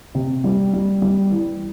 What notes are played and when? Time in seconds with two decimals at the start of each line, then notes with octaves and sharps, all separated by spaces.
0.15 C3
0.44 G3
0.73 G3
1.02 G3
1.31 E3